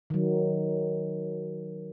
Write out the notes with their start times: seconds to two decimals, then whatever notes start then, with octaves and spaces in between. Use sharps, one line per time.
0.10 D#3 F#3